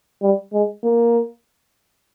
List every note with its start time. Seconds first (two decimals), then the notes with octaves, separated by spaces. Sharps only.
0.22 G3
0.53 G#3
0.84 A#3